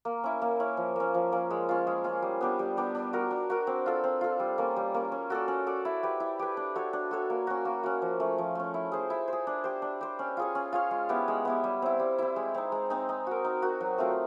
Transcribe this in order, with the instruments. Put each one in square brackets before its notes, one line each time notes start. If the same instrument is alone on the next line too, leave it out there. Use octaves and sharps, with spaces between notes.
[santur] A#3
C#4 E4
A#3
C#4 E4
F3
A#3 C#4
F3
A#3 C#4
G#3
C#4 F4
G#3
C#4 F4
G3
B3 D4 G4
G3
B3 D4 G4
D4
F#4 A#4
D4
F#4 A#4
C4
F4 A4
C4
F4 A4
G3
A#3 C#4
G3
A#3 C#4
C#4
F#4 A4 D5
C#4
F#4 A4 D5
E4
G4 B4
E4
G4 B4
D4
F#4 A4 C#5
D4
F#4 A4 C#5
A#3
C#4 F#4
A#3
C#4 F#4
F3
A3 C#4
F3
A3 C#4
E4
G#4 C5
E4
G#4 C5
D4
G4 C5
D4
G4 C5
C#4
F4 G#4 C#5
C#4
F4 G#4 C#5
G#3
B3 E4 G4
G#3
B3 E4 G4
G3
C4 E4
G3
C4 E4
G#3
C4 D#4
G#3
C4 D#4
D#4
F#4 A#4
D#4
F#4 A#4
F#3
A3 C4 F4